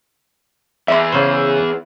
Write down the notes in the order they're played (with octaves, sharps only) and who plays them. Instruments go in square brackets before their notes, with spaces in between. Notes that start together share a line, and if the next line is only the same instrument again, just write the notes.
[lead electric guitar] E2 [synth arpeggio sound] E5 C6
[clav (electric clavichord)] C#3 C5